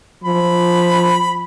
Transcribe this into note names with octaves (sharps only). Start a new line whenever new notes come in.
F3 B5